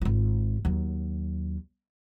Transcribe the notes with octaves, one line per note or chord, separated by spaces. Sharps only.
G#1 F4
D#2 F#3